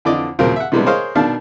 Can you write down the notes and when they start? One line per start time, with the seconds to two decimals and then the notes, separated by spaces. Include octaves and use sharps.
0.05 F2 D3 E3 D5 D#5 D6
0.39 D#2 A#2 C#3 F#3 C4 A#4
0.56 E5 F#5
0.72 C3 E3 G3 G#3 B3 D4
0.86 G#4 A#4 C5 C#5 D#5 F5
1.15 B2 D#3 D4 F5 A5